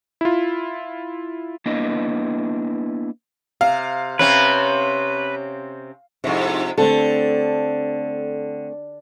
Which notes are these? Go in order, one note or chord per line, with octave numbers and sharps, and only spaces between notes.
E4 F4
A#3 B3 D4 E4 B4 D#5
C3 F5
C3 C4 C#4 B4
F2 G#2 C3 D#4 E4
D3 A3 C4 A4